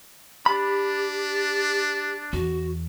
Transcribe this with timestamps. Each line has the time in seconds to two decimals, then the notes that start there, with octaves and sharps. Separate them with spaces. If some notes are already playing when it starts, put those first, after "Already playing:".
0.46 D4 G4 B5
2.33 E2 F#4